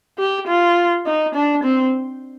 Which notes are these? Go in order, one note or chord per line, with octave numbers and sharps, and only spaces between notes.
G4
F4
D#4
D4
C4